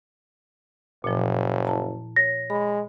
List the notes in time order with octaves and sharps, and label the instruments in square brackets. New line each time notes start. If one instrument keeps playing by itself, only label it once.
[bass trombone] F#1 [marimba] A#2 F3
[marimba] E4 A5 A#5
[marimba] C#5 [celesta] A#6
[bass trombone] G#3 [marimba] B5